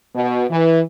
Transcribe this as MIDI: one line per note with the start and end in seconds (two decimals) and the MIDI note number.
0.15 0.44 47
0.50 0.81 52